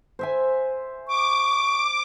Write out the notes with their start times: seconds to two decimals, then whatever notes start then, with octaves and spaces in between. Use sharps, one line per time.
0.19 C5 E5 G#5
1.08 C#6 D6